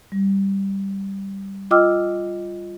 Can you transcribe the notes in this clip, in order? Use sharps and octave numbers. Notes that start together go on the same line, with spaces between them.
G3
F4 D#5 G5 D6 E6 F6